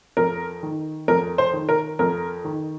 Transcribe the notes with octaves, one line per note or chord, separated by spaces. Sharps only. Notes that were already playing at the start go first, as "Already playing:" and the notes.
F2 A#4
D#3
F2 A#4
C5
D#3
A#4
F2 A#4
D#3